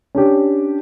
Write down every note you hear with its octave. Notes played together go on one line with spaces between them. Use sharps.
C#4 D4 G4